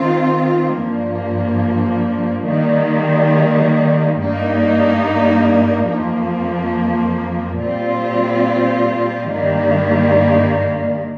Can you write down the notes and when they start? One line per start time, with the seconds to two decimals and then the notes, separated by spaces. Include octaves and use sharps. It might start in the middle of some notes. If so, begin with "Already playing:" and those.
Already playing: D#3 C4 F4
0.77 G2 F3 A#3
2.47 D#3 G3 A#3
4.18 G2 G3 A#3 D#4
5.88 F2 F3 A#3
7.59 A#2 G3 C4 F4
9.30 G2 D#3 G3 A#3